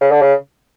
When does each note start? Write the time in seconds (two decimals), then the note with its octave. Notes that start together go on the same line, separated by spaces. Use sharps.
0.01 C#3
0.11 D3
0.22 C#3